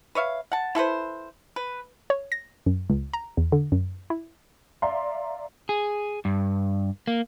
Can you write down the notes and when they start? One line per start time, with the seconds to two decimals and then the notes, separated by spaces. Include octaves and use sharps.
0.15 B4 C#5 E5 F5
0.52 F#5 A5
0.75 E4 A4 B4 C5
1.56 B4
2.10 C#5
2.32 A#6
2.66 F#2
2.90 C#2
3.13 A#5
3.37 E2
3.52 D3
3.72 F#2
4.10 E4
4.82 D5 E5 F5 A#5 C6
5.69 G#4
6.25 G2
7.07 A#3